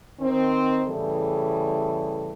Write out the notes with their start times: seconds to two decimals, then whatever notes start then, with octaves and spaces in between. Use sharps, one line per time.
0.20 D#3 C4
0.87 A2 C#3 E3 G3 G#4 A4